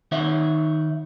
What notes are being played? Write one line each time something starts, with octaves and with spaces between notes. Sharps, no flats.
D#3 D#4 C#5 E5 F#5